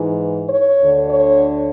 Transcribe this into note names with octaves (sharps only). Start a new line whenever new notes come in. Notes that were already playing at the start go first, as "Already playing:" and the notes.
Already playing: G#2 E3
C#5
D2 D3
C#5